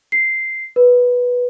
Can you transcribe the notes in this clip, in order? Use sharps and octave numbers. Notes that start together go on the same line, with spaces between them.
C7
B4